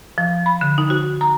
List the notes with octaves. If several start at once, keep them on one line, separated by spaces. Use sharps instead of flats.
F3
B5
D3
D#4
F#4
A#5